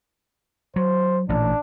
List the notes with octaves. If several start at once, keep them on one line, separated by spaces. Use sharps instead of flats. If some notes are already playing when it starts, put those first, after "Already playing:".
F#3 C5
A1 A#2 D4